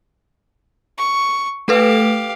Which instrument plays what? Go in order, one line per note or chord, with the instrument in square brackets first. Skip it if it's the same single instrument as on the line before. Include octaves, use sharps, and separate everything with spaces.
[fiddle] C#6
[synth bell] A3 A4 B4 [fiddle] G4 F5